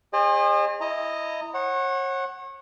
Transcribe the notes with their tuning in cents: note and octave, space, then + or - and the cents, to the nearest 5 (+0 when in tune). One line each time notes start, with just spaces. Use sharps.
G#4 -35 C5 +30 D#5 -40
E4 +0 D#5 +0 A#5 -30
C#5 -35 F#5 +0